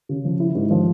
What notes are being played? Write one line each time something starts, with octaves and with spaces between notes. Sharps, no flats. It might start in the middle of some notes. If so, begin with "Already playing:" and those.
C#3
F3
E4
G#2
F3